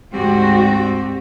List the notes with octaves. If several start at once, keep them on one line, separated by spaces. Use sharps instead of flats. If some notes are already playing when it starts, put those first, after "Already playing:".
D2 G#2 C4 F#4 G4